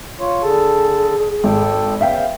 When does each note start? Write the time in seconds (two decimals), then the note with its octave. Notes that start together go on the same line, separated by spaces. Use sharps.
0.20 F4 C#5
0.43 D3 G#4 A4 A5
1.44 G#1 A4 G5
2.01 C#3 B3 E5 F5 G5